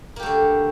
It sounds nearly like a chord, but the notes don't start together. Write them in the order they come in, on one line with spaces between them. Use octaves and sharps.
A#3 G4 A3 D3